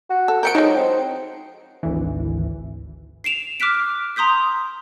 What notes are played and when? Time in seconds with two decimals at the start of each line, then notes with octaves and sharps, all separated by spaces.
0.10 F#4
0.28 A4
0.43 F3 B3 A#4 G6 C#7 D7
0.55 F3 F#3 G#3 D#4
0.75 C4
1.83 G#1 D2 E3
3.24 C7 D7 E7 F7
3.60 D6 F6 F#6 B6 D7
4.16 A#5 C6 D#6 G6 B6